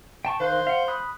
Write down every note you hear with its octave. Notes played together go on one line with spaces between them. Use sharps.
G5 A5 C#6
D#3 C5 F5 F#6
F5 F#5
B5 D#6 F#6